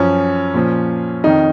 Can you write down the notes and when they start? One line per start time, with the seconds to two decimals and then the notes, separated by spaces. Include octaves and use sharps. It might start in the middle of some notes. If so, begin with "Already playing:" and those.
Already playing: F#2 F3 C#4
0.54 A#2 F3
1.24 F2 D#3 D#4